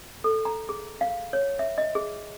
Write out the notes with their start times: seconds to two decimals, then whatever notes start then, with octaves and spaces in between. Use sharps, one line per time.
0.24 A4
0.45 A#5
0.69 G#4
1.01 F5
1.33 C#5
1.59 E5
1.78 D#5
1.95 G#4